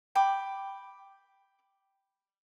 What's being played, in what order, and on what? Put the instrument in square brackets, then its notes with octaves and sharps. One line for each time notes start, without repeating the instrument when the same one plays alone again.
[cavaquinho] G5 B5 D6